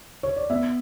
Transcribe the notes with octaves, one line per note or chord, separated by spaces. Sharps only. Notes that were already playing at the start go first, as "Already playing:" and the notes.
C#5
D5
B3 E5